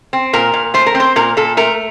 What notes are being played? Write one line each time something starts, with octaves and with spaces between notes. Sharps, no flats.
C4
A#2 A#4
A#2
A3 C5
A#4
C4
C5
A#2 A#4
A#2 A4
A3 A#4